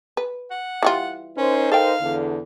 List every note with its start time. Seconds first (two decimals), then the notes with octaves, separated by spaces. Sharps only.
0.17 B4
0.51 F#5
0.83 E3 G3 F4
1.37 C#4 D#4 A#4 C5
1.72 A4 F5 G5
2.01 E2 D3